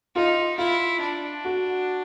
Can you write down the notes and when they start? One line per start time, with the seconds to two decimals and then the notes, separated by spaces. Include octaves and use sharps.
0.16 D#4 F4
0.58 E4 F4
1.01 D4
1.45 F#4